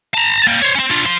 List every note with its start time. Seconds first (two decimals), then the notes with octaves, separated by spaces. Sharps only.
0.14 A5 A#5
0.47 G3 A#3
0.62 C5 C#5
0.75 C4 C#4
0.91 D4 F4
1.05 F3 C6